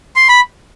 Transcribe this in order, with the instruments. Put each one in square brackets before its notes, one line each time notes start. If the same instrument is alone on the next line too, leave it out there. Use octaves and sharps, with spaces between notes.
[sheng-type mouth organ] C6
B5